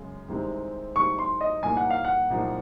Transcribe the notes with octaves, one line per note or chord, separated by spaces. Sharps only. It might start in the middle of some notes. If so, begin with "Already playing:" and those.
Already playing: F#2 C#3 G#3
C2 C3 D#3 G#3 C4
C2 C3 D#3 G#3 C4 C#6
C6
D#5
C2 A#2 F3 A#3 D#4 G#5
F#5
F5
F#5
C2 A#2 F3 A#3 D#4